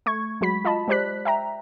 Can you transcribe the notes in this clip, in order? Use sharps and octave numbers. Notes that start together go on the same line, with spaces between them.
A3 C#6 G#6
F#3 G#3 F#4 B5 B6
F4 D#5 A5 B5
G#3 G4 C5 D5 F#6 B6
E5 G5 A#5